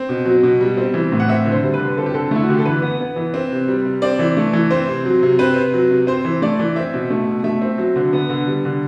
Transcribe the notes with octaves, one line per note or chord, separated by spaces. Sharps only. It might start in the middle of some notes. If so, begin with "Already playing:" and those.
Already playing: C4
B2
F#3
B2
G3
C4
E3
A2
F#5
C4 E5
D3
C5
G3
B4
D3
C4 A4
G4
D3 A4
A3 E4
F#4
D3 G4
A4
E3 B4
B3
B3
E3
C4
C3
G3
C3
C4 D5
E3
A3
E3
C4 C5
C3
F#3
C3
C4 B4
C3
F#3
C3
C4 C5
E3
A3 D5
E3
C4 E5
B2
A3
B2
A3 E5
C4
F#3
D3
B3
D3
G3
D3